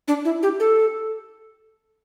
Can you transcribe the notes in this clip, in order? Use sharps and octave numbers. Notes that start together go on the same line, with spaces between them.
D4
E4
G4
A4